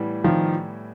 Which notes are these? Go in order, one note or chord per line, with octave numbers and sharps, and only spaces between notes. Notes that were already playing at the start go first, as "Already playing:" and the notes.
Already playing: A2 E3 G3 B3
D#3 F3